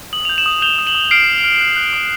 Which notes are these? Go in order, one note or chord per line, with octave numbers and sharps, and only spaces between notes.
D#6 F#7
G6 F7
E7 F#7
D#6
G6 F7 G7
D#6
E7 F#7
D#6
F6 C7 D7
F6
F6
F#6
F#6
D#6